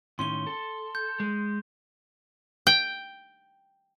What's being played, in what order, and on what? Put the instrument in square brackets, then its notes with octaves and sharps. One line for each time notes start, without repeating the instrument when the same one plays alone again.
[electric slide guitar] A2 D#3 C#4 [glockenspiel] C6 G7
[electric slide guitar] A4
[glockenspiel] G6
[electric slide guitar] G#3
[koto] G5